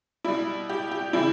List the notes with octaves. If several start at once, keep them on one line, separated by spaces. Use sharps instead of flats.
B2 G3 E4
G4
G4
C#3 E3 G3 E4